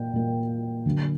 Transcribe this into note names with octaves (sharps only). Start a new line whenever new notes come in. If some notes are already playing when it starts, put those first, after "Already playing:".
Already playing: A#2 A#3 G5
A#2 A#3
D3 F#3 A#3